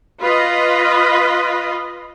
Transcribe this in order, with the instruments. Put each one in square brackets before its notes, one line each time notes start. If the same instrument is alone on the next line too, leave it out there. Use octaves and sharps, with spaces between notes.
[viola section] F4 B4 D#5